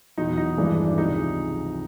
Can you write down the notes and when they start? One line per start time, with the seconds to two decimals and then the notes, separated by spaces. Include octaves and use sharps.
0.18 E2 B2 F#3 D#4
0.38 D#4
0.57 G#1 G2 E3 G#3 D4
0.87 D4
0.98 C#2 C3 F3 G#3 D#4